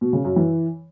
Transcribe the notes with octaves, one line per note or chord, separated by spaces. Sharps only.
B2
C#3
F#2
E3